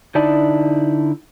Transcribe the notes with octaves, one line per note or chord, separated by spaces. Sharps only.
D3 D#4 E4 D5 A5